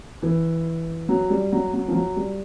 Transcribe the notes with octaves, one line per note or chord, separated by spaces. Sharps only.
E3
F#3
G3
F#3
F#3
F3
F#3
G3